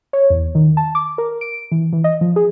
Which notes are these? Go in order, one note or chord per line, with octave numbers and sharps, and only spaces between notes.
C#5
E2
D#3
A5
D6
A#4
D7
E3
E3
D#5
F3
G#4